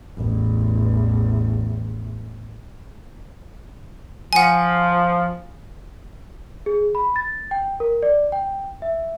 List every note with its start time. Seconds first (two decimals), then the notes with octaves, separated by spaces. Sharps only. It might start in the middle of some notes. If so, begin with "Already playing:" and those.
0.16 A1 E2
4.33 F3 F#5 G#5
6.66 G#4
6.95 B5
7.16 A6
7.51 G5
7.80 A#4
8.03 D5
8.32 G5
8.82 E5